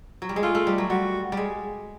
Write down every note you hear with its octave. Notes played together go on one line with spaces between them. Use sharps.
F#3
G3
G#3
A3 F4
A3
G3
F#3
G3 F#4
G3 G#3